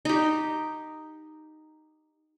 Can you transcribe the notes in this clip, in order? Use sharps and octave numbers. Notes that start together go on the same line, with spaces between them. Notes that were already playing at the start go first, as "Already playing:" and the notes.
D#4 G4